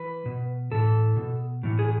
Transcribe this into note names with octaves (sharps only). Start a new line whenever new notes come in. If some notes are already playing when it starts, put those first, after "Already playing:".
Already playing: E3 B4
B2
A2 E3 A4
B2
A2 E3
G#4